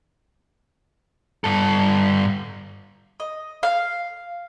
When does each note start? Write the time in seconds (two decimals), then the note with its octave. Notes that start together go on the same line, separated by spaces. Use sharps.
1.44 G2 A4
3.20 D#5
3.63 F5